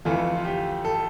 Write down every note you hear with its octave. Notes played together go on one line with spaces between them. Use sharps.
F2 E3 A3 F4
F4
G4
A4